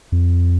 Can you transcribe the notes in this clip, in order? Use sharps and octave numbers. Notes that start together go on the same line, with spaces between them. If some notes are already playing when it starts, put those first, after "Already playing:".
F2